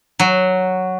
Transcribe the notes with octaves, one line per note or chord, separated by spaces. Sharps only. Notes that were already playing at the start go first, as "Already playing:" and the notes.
F#3